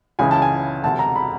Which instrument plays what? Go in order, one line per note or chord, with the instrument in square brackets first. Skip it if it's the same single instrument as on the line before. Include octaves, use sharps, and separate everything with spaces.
[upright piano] C#2 C#3 E3 G#5
A5
G#5
E1 D2 C3 A5
A#5
B5